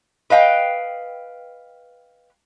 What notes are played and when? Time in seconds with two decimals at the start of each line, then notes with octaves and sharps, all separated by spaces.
0.30 B4 D#5 F5 G5